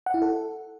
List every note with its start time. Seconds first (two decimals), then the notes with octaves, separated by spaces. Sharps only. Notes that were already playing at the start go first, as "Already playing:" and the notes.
0.06 F#5
0.14 E4
0.22 A4